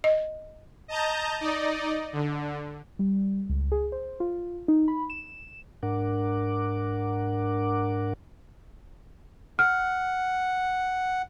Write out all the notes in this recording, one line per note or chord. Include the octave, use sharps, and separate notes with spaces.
D#5
D#5 A5 A#5 G6
D#4 D5 D#5
D3
G3
C#2
G#4
C5
F4
D#4
B5
E7
G#2 D4 A#4 F#5 D6
F#5 F6